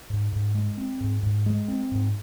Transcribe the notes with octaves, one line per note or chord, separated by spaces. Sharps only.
G#2
G#2
G#3
C4
G#2
G#2
G#3
C4
G#2